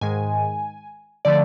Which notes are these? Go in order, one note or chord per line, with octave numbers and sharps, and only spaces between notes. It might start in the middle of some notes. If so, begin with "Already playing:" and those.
G#2 D#3 G#3 G#5
D3 F3 A3 D5